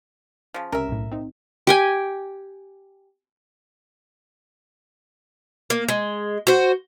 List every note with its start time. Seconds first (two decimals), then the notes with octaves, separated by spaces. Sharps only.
0.54 C#3 F3
0.72 C#2 C3 C#4 A#4 E5
0.89 B1 A2
1.12 C4 D#4
1.67 G4 G5 G#5
5.70 A#3
5.88 G#3
6.47 F#4 C5